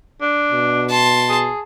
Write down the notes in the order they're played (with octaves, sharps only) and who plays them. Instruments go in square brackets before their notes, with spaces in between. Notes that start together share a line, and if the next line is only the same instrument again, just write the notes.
[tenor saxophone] D4
[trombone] B2
[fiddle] A5 C6
[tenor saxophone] G#4